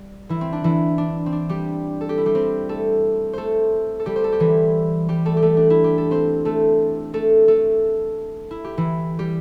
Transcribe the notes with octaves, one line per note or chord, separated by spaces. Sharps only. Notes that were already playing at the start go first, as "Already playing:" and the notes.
Already playing: G3
E3 E4
C4
D4
E3 E4
D4
C4
D4
G3 G4
A4
G4
E4
G3 G4
C4 C5
A3 A4
A3 A4 C5
A4
G3 G4
C5
A4
G4
E3 E4
G3 G4
A3 A4
G4
A3 A4
D4
E4
G4
A4
C4 C5
A3 A4
A3 A4
A3 A4
E4
G4
E3 E4
G3 G4